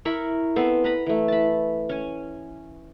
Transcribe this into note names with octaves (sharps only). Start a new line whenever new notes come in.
E4 A#4 B5 C#6
B3 C4 A4 C5
B4 A#5 B5
E3 A3
A5 B5
C#4 G#5